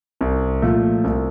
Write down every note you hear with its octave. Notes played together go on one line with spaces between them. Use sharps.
C2
A#2 F3 A3
C2